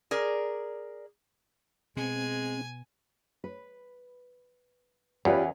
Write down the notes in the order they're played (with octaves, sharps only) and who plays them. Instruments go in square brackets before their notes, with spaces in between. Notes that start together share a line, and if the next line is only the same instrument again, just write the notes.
[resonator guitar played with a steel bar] G#4 A#4 D5
[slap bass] B2 [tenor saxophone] G#3 [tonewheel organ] C4 [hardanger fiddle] G#5
[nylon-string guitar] B4
[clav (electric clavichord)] E2 [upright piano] C#4 B4 [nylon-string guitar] F4 G4 D5